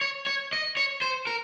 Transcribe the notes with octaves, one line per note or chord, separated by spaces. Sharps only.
C#5
C#5
D#5
C#5
C5
A#4